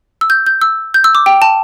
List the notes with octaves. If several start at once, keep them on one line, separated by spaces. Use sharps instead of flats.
E6
G6
G6
E6
G6
E6
D6
G5
A5